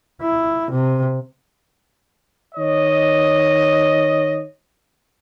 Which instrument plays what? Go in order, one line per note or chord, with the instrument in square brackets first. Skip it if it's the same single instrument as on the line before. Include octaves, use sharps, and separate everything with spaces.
[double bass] E4
C3
[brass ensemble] D#3 C#5 D#5